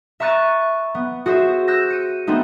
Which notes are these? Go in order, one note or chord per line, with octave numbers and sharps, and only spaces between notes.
E5 A#5 C#6 F#6 A6 D#7
B3
F#4 G#4 C5 E5
E6 F#6 G6 A#6
C#7 D#7
A3 B3 C4 D#4